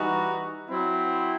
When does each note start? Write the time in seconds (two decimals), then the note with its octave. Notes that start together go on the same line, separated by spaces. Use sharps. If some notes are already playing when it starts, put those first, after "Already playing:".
Already playing: E3 G3 D#4 F#4
0.68 F#3 C4 E4